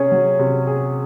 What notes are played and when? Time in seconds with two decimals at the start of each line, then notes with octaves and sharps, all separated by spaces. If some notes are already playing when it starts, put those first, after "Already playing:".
Already playing: C3 C#4 G#4 C#5
0.12 F#3
0.39 C3
0.67 G#4